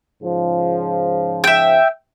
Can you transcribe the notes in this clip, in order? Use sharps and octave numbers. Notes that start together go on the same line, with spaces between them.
G#2 C#3 F3
E5 G5